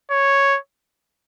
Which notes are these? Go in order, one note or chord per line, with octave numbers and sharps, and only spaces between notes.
C#5